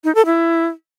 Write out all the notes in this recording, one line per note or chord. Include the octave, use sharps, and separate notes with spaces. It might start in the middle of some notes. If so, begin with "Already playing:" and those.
D#4
A4
E4